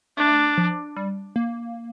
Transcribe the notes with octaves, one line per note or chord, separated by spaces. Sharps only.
A3 D4
F3
G3
A#3